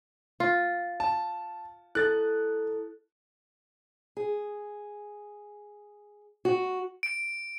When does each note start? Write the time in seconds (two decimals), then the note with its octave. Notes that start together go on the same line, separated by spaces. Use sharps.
0.40 F4
1.00 A5
1.95 E4 A4 F#6 A6
4.17 G#4
6.45 F#4
7.03 D7